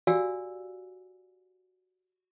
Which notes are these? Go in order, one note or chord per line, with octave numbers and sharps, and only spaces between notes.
F#4 G4 D5 F5 G#5 E6